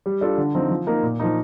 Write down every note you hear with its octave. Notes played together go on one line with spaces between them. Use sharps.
G3
D4 F4 A4
D3
F3 C4 D#4
F3
A#3 D#4 A#4
A#2
F3 A#3 D#4